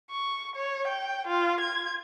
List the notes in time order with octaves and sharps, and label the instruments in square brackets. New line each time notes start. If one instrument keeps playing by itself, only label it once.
[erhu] C#6
C#5
G5
F4
G#6